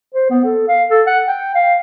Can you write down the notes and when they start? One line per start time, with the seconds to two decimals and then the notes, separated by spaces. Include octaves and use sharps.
0.14 C5
0.30 B3
0.45 A4
0.68 F5
0.90 A4
1.06 F#5
1.27 G5
1.55 F5